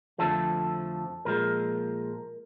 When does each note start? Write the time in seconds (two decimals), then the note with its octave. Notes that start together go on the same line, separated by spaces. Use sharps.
0.18 F2 D3 F3 A3 A4
1.25 A#2 F3 G#3 A#4